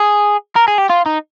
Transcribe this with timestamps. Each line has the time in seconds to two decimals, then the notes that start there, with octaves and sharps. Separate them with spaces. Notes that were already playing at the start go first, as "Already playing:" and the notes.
Already playing: G#4
0.56 A#4
0.68 G#4
0.78 G4
0.89 F4
1.06 D#4